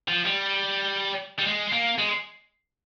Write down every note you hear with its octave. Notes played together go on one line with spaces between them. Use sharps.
F3
G3
G3
G#3
A#3
G#3